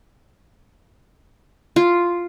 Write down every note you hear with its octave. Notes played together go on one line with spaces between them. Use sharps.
F4